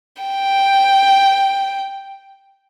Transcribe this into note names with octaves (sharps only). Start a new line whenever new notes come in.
G5